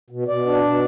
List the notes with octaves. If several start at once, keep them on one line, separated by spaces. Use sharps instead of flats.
B2
B2 D5
D4
B2